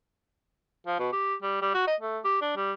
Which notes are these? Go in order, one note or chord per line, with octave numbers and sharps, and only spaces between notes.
F3
B2
G4
G3
G3
F#4
D#5
A3
G4
D4
G3